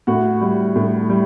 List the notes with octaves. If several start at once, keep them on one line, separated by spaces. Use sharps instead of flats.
A2 F#4
G3
A2
G3